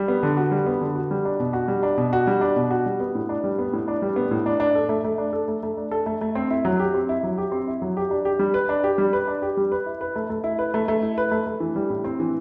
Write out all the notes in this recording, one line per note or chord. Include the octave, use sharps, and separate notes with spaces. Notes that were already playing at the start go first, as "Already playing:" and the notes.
Already playing: G3
B3
D3
F#4
G3
B3
D3
F#4
G3
D4
B2
F#4
G3
D4
B2
F#4
G3
D4
B2
F#4
G3
B3
A2
D4
G3
B3
A2
D4
G3
B3
A2
D4
D4
A4
A3
A3
D4
A4
A3
A3
D4
A4
A3
A3
C4
E4
F#3
G4
C4
E4
F#3
G4
C4
E4
F#3
G4
D4
G4
G3
B4
D4
G4
G3
B4
D4
G4
G3
B4
E4
B4
A3
A3
E4
B4
A3
A3
E4
B4
A3
A3
E3
G3
A2
C4
E3